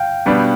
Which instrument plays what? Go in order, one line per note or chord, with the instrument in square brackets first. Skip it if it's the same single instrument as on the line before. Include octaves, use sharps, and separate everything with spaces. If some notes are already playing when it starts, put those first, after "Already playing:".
Already playing: [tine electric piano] F5 G5
[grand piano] B2 G3 B3 D4